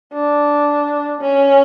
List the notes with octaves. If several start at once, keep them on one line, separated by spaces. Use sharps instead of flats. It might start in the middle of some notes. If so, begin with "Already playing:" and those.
D4
C#4